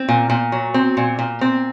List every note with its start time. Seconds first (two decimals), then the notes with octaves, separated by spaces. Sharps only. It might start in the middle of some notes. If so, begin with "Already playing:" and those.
Already playing: C4
0.09 A#2
0.30 A#2
0.52 F#3
0.74 C4
0.97 A#2
1.19 A#2
1.41 C4